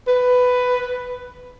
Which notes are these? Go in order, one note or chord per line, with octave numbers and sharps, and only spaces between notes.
B4